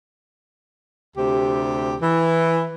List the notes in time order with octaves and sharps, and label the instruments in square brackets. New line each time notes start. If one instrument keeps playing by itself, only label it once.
[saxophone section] D2 C3 G4
E3